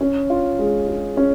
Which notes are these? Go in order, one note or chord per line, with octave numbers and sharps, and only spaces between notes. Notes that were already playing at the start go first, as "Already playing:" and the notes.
C#4
F4
G#3
G#4
C#4